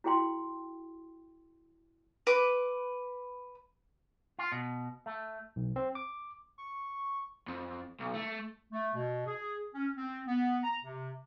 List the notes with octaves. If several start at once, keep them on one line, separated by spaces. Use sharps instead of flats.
E4 F#4 G#4 G5 C6
B4 D6
F4
B2
A3
B1
C4
D6
C#6
F2
B1
A3
A3
B2
G#4
C#4
C4
B3
A#5
C3